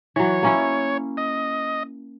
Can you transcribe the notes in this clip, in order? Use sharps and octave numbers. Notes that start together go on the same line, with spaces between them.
E3 F#3 C#5
A#3 C#4 E4
D#5